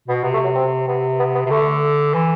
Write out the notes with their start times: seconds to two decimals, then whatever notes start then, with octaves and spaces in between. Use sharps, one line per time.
0.08 B2 B3
0.24 C3 B3
0.34 A3
0.44 F#3
0.55 C4
0.87 C3 B3
1.20 B3
1.35 B3
1.46 C3
1.51 D3 A3
2.14 E3